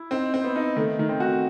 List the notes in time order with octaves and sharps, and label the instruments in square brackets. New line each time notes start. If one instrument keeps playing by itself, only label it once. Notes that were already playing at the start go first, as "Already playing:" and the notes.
Already playing: [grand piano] E4
[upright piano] C4 [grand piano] D#4
[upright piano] C4
[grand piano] B3
[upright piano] D#4
[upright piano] D#3 [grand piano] A3
[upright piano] D#3
[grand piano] C4
[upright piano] F#4